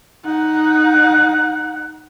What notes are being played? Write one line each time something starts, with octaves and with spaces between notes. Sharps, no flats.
D#4 F#5